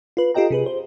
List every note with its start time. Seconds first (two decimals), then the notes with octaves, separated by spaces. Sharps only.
0.17 F4 B4
0.35 F4 G4 A4 D#5 G5 A#5
0.51 C3 G#4 B4
0.66 C5